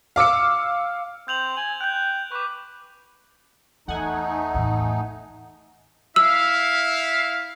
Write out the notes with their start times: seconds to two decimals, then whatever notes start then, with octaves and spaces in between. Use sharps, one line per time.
0.16 F5 D6 E6 C#7
1.28 C4 G6 F7 F#7
1.57 G#5 F#7
1.81 G5 F#6 G6
2.32 B4 C#6 D6
3.88 E2 A3 D#4 F#5 G#5
4.54 E2 A2
6.16 E4 E5 F5 E6